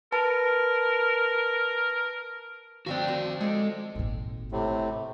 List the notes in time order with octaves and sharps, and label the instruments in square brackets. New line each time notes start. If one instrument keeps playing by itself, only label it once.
[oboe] A#4 [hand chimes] B4 A5
[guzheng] F3 C4 D4 [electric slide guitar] F#4 D5
[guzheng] C5
[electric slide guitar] G#3 [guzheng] A4 D5
[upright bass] G#1 A#2
[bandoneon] A2 C3